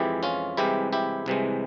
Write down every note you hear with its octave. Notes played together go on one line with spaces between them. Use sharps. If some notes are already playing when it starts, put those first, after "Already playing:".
Already playing: F2 E3 G#3 E4 G4
C#4 F4
C2 C3 E3 G#3 E4 G4
E4 G4
C2 C3 E3 G#3